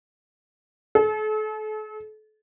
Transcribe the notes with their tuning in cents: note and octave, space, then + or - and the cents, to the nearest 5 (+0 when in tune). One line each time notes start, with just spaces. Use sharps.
A4 -40